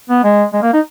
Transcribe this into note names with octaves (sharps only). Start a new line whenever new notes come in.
B3
G#3
G#3
A#3
D#4